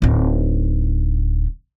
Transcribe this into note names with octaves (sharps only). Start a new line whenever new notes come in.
D1 D#4